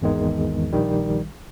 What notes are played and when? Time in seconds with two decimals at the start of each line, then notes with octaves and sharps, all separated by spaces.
0.02 G#1 E2 D#3 G#3
0.72 A#1 D#3 G3